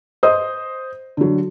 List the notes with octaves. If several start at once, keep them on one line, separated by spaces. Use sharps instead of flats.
C5 D#5 D#6
D3 F#3